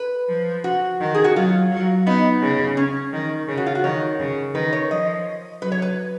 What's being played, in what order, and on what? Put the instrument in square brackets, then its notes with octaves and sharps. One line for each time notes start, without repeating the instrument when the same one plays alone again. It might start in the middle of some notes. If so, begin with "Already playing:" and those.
Already playing: [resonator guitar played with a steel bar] B4
[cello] F3
[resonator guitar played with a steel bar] F#4
[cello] D#3
[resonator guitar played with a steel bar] G#4
F#4
[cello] F#3 [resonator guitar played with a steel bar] F4
[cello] F#3
[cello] B3 [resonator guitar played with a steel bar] D#4
[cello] C#3
[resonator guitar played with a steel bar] C#4
[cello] D#3
C#3
[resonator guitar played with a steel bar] F#4
F4
F#4
[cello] D#3 [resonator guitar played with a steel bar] C#5
[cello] C#3
[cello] D#3 [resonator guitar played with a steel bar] B4
[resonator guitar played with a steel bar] C#5
[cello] F3 [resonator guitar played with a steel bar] D#5
[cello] F#3 [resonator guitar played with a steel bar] B4
[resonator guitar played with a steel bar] C#5
B4